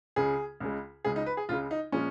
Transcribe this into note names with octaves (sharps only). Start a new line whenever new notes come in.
C#2 C#3 G#3 G#4
C#2 C#3 G#3
C#2 C#3 G#3 G#4
D#4
B4
G#4
C#2 C#3 G#3 F4
D#4
A#2 F3 G#3 C#4